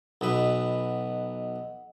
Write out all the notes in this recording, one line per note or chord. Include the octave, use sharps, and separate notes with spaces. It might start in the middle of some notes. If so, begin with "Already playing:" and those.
B1 B2 B4 D#5 F#5